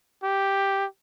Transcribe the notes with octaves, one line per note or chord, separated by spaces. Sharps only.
G4